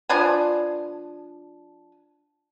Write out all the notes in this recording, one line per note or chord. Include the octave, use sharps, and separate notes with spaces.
F3 D4 B4 G#5